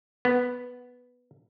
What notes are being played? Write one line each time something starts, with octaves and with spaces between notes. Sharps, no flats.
B3